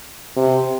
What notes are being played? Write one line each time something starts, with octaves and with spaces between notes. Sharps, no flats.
C3